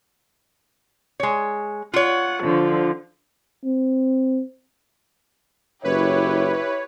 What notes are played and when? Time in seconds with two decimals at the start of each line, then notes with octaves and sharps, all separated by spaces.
1.20 G#3 C#5
1.94 F4 C#5 F#5
2.43 D3 F3
3.65 C4
5.84 F#1 E4 G4 B4 C#5